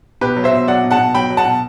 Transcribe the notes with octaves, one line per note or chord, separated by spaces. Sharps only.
B2 G4 B4
F#3
C5 E5
B2
F#3 D5 F#5
B2
F#5 A5
B2
F#3 G5 B5
F#3
F#5 A5
B2